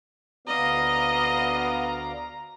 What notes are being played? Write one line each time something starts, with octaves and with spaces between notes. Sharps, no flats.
D2 B3 D5 D#5 F5 A#5